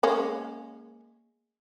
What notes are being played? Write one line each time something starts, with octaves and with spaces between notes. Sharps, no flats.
G#3 A#3 C#4